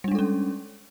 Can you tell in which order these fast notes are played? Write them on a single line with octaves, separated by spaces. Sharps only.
G3 D4 G#3 A4 C#4